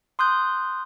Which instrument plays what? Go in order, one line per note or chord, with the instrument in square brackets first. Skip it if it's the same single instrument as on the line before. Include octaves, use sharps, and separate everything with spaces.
[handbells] C6 D#6 F#6 G6